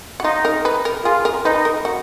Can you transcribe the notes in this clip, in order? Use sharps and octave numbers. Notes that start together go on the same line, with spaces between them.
F#4
D#4 F4
A#4
B4
A#4
F4 G#4
A#4
D#4 B4
A#4
F#4